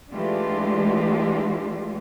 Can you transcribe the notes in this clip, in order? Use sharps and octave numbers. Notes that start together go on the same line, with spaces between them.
E3 G#3 A3 D4 F4 G4